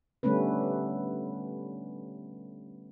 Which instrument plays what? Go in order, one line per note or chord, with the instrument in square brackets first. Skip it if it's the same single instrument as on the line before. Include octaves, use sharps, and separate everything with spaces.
[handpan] D3 G3 A3 B3 C#4 B4